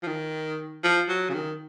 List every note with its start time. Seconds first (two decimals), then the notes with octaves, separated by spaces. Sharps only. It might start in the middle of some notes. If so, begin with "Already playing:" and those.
0.03 F3
0.07 D#3
0.84 F3
1.09 F#3
1.30 C#3
1.34 D#3